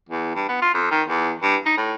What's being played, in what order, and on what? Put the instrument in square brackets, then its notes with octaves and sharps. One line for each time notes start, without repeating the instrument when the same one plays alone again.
[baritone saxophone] E2
G2
B3
F4
F2
D#3
E2
G2
D#4
A2